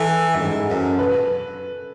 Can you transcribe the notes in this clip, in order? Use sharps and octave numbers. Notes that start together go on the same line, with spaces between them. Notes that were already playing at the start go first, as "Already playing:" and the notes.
Already playing: E3 A4
F#2
G#2
F#2
B4